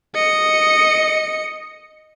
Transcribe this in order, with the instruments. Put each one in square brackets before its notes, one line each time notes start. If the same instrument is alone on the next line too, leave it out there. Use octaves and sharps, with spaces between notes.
[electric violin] D#5 C#7